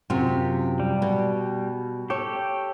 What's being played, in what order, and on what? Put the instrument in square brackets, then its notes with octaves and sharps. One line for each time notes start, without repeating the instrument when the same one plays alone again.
[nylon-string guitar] F#2 C3 F4
[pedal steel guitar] G3
[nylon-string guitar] B2
[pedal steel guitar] G4 A4 [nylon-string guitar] C#5